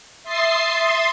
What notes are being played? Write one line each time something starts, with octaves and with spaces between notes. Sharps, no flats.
E5 C6 D#6 A6 C7